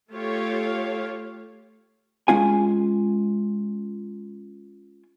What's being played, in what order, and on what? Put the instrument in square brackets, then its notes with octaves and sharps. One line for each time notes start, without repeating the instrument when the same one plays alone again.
[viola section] A3 F4 G4 A4 C#5 F5
[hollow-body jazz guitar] G#3 C#4 F4 G#5